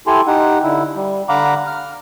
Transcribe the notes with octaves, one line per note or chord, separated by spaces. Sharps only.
E4 G4 A4 G#5 C6
D#4 G4 F#5
D3 E4
G3
D3 F5 F#5 A#5 B5 D6
F6